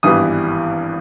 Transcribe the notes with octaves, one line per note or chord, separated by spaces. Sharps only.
G#1 G2 E3 G3 B3 D#6